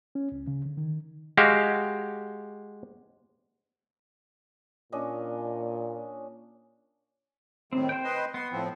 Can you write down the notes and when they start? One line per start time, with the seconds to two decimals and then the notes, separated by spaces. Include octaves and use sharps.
0.15 C#4
0.32 C#2
0.47 C#3
0.65 D3
0.77 D#3
1.37 G#3 F#4 G4 F5
4.92 A#2 C#4 D4 D#5
7.73 A2 C3 D#3 C4
7.89 C5 G5
8.04 B4 D#5 C6
8.34 B3 C6
8.52 A2 F3 C4